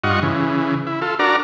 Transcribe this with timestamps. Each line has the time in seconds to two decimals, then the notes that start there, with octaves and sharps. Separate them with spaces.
0.04 G2 F4 D#5 F#5 C#6
0.23 C#3 E3
0.87 E4
1.02 F4 A4
1.19 D4 F#4 A#4 D5 A#5